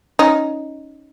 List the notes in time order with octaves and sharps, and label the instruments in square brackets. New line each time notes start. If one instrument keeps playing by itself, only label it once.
[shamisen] C#4 D#4